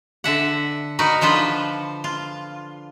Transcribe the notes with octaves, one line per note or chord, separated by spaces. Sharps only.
D3 E5 F#5
D#4 F#4 A#4 B4
D3 F3 F4 B4 C5
F4